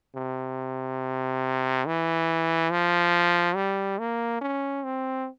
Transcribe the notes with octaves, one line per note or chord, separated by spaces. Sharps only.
C3
E3
F3
G3
A#3
C#4
C4